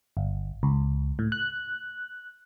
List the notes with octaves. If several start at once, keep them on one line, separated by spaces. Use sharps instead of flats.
G1
C#2
A2
F#6